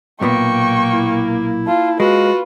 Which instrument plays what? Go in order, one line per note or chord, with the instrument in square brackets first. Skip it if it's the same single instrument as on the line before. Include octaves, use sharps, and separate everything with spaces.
[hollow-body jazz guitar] B1 A#2 B3 [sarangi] A#3 [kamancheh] G5 C#6
[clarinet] E4
[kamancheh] F4 A5
[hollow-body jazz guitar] G#3 [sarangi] F4 [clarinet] F#4 [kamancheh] B4